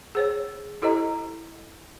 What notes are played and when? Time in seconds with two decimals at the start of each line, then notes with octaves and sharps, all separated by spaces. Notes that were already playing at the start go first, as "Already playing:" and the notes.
0.15 G#4 C5 C#5
0.82 E4 G4 A4 C5 D#5 A#5